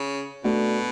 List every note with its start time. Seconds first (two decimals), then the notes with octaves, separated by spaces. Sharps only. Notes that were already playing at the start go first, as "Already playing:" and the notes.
Already playing: C#3
0.44 B2 A3 D4 F#4